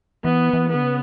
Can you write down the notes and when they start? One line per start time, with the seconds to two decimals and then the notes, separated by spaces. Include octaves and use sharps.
0.24 E3 B3
0.53 E3
0.69 B3
0.75 D3
0.83 C#3